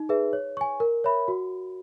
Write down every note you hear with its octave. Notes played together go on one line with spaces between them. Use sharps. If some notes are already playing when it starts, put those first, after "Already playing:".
Already playing: D#4
G#4 B4 E5
C#5
G#5 C#6
A#4
C#5 E5 B5
F#4